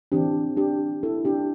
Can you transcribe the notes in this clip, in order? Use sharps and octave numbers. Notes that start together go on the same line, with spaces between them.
E3 C4 D4 G4
D4 G4
E4 A4
D4 G4